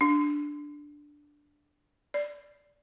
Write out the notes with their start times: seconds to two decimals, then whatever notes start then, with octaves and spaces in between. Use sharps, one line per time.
0.01 D4
2.14 D5